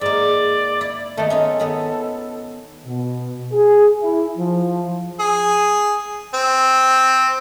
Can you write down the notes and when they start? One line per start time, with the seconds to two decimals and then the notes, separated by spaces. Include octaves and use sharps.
0.01 G#2 A#3 D5
0.81 E4
1.17 D#3 A3 B3
1.30 C#4 D#4 F4 A4
1.60 D#3 B3 B4
2.85 B2
3.52 G#4
4.02 E4
4.37 F3
5.20 G#4
6.34 C4